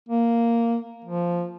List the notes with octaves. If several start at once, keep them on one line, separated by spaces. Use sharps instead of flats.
A#3
F3